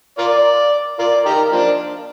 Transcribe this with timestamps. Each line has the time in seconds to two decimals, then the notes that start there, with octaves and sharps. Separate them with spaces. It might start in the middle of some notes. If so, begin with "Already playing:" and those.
0.18 F4 A#4 D5
0.99 F4 A#4 D5
1.26 D#4 G4 A#4
1.52 F3 A#3 D4